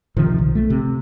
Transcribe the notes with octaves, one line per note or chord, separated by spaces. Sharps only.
C3 D#3 F3
B1
A3
C3